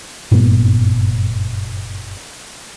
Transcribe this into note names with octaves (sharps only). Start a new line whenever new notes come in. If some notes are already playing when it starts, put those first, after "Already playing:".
F#1 G2 A#2 B3